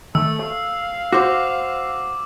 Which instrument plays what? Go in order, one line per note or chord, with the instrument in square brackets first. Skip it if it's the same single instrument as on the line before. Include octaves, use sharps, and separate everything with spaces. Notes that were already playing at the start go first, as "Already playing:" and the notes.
[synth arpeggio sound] D#3 [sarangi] A3 [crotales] E6
[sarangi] F5
[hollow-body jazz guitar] F#4 C5 [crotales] D6